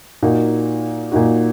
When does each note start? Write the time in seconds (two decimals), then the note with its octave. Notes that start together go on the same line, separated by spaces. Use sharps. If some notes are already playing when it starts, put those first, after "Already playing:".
0.22 A#2 A#3 D#4 F#4
1.12 A#2 A#3 D#4 F#4